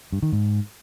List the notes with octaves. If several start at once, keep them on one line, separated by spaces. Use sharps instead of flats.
G2
D#3
G#2